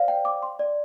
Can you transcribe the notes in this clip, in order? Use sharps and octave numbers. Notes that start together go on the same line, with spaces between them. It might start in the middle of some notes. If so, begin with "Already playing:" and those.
Already playing: C5 D5 F5
G5
D6
C6
D5